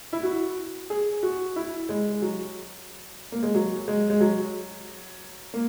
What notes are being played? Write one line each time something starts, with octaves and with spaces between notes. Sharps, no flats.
E4
F#4
G#4
F#4
E4
G#3
F#3
A#3
G#3
F#3
G#3
G#3
F#3
A#3